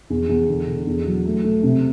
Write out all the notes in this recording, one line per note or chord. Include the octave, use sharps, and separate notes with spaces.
E2
E2
D3
D3
E2
F#3
A3
A3
C3